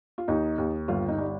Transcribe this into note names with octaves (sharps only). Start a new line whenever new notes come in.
F4
D#2 D#4
D#2
G1 F4
D#4
G3